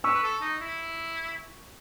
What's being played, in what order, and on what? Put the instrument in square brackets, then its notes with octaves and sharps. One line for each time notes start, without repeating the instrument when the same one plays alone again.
[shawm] B4 [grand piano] C#6 E6
[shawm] B4
A4
D#4
E4